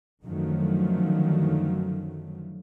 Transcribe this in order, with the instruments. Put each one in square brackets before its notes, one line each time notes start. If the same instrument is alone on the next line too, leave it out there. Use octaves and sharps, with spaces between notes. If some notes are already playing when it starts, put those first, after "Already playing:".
[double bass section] F#2 D3 D#3 F3 F#3 A3